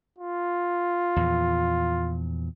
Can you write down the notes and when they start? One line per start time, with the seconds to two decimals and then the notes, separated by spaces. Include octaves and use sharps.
0.18 F4
1.16 E2 A#2 F3